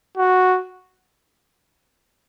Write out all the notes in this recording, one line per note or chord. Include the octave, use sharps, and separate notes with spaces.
F#4